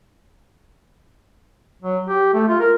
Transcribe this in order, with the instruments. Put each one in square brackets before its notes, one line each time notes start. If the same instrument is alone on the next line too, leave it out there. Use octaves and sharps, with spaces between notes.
[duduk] F#3
G4
A3
F4
A#4